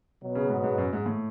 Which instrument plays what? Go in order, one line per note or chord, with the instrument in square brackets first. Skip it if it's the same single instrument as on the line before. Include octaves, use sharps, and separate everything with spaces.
[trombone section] B2 F#3 B3
[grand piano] C#3
G#2
G#2
F#2
G#2
A2